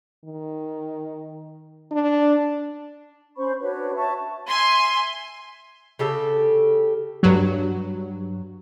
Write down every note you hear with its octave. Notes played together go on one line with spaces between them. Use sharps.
D#3
D4
C#4 C5 B5 C#6
D4 F#4 B4 C#5
C#5 E5 A5 C#6
E5 G#5 C6
C#3 G4 A4
G2 F#3